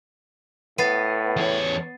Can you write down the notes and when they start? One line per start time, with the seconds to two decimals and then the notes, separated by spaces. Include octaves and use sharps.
0.78 A2 B3 A6 C7 D#7
1.36 E2 C#5